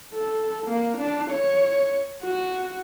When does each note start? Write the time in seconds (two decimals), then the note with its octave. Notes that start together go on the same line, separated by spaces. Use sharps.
0.14 A4
0.67 A#3
0.98 D4
1.31 C#5
2.23 F#4